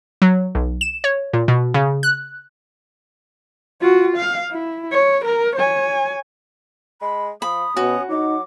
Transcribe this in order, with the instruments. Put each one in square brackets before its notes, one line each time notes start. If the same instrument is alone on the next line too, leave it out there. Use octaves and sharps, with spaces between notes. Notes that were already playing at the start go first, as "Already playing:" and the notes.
[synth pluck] F#3
B1
E7
C#5
A#2
B2
C#3
F#6
[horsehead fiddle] F4 F#4
F5
E4
C#5
A#4
C#5 G#5
[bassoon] G#3 [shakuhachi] B5
[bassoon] F3 [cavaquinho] B5 [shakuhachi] D#6
[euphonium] B2 [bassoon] C#4 [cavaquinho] F#4
[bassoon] F#3 [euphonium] D#4 [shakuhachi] D6